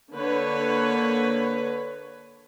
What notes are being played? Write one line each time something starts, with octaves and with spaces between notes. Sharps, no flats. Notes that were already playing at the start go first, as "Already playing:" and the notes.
D3 A#3 B4 C#5